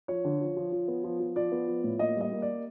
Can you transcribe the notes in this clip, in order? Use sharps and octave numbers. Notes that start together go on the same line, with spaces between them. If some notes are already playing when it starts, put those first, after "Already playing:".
F3 C#5
D3
F3
F3
F3
B3
F3
F3
F3 D5
B3
F3
A2
A#3 D#5
G3
D#5
A#3
D5